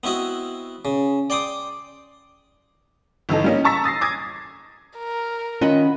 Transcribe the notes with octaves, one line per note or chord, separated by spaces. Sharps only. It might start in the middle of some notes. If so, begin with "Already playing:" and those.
B3 C4 E4 F#4 D#5
C#3
D5 G5 C6 D6 D#6
G1 E3 D#4 A4
G3 A#3 C#4 D#4
A5 A#5 C#6 E6 A6 B6
D#6 A6 A#6 C7
D6 D#6 G#6 A6
A#4
D#3 C#4 F4 D#5 F#5 B5